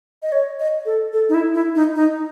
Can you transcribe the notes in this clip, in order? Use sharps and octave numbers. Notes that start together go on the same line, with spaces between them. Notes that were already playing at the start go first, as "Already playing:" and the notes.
D#5
C#5
D#5
A4
A4
D#4
E4
E4
D#4
D#4